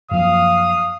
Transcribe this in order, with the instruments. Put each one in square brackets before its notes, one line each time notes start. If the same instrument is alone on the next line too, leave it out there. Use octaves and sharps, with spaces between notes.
[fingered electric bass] F#2 F3 A#3 [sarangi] F5 [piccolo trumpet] D#6